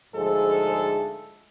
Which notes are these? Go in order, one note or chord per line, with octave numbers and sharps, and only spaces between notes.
D2 G#2 F3 G#3 G#4 A4